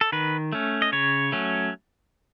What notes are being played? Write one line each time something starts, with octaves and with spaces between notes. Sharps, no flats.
A4
D#3 B4
A3 C#4
D#5
C#3 C#5
F#3 A3 C#4